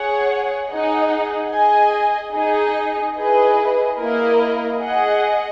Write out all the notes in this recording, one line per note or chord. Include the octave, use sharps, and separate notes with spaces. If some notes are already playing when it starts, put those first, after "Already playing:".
Already playing: G#4 C#5 F#5
D#4 G#4 D#5 F#5
G#4 D#5 G#5
D#4 G#4 D#5
E4 G#4 B4 D#5
A#3 E4 A#4 D#5
G#4 D#5 F#5